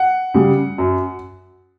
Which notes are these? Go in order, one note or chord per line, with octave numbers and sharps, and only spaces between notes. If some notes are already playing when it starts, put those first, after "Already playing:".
Already playing: F#5
C#3 G3
F#2